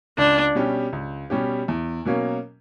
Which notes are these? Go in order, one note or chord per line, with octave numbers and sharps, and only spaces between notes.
C#2 D4
B2 G3 C#4 G4
C#2
B2 G3 C#4 G4
E2
B2 F#3 A#3 C#4